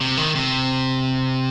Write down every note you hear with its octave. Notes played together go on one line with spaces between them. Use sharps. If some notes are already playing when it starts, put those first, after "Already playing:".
C3
D#3
C3